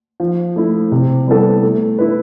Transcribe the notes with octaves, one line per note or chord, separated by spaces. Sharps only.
F3
A3 E4
C3
G3 B3 E4 A4
A3
E4 B4